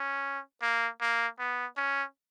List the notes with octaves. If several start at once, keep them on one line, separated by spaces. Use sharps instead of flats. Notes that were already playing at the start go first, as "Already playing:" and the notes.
Already playing: C#4
A#3
A#3
B3
C#4